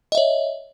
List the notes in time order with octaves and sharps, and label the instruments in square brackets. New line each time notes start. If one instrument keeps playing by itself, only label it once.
[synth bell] D#5
E5
C#5